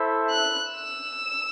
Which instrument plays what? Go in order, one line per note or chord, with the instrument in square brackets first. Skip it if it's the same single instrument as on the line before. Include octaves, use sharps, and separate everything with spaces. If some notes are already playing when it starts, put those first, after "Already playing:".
Already playing: [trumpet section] E4 A4 C5 E5
[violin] F#6
E6